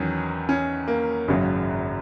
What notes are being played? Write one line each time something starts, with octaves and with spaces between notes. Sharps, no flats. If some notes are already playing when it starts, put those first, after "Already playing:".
Already playing: E2 D#3 F#3 C#4
C#4
A#3
G#1 F#2 C#3 F#3